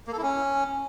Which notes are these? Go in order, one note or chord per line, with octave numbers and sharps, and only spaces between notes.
A#3
A4
E4
C#4